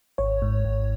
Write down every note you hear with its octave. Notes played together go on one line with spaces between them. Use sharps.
G#1 C#5
G#2
G#1